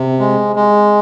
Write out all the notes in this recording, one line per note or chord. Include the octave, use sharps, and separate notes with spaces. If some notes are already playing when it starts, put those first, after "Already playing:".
Already playing: C3
G#3
G#3